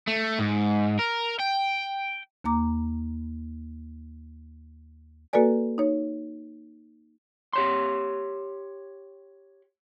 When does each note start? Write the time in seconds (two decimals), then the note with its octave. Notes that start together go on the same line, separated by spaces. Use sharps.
0.08 A3
0.39 G#2
0.99 A#4
1.40 G5
2.44 D#2 A#3 A#5 D6
5.33 A#3 F#4 A4 B4 D5 G#5
5.78 D#4 C#5
7.53 G4 C#5 C6